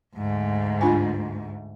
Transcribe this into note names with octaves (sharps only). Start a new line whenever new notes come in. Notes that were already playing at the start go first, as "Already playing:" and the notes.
D2 G#2
D4 F4 G#5